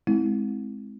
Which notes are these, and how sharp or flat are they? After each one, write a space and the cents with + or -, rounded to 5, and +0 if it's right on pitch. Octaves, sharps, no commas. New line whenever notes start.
G#3 +25 C4 +0 E4 -20